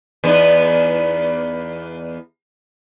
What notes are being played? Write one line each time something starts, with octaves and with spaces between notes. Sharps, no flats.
E2 B3 D#4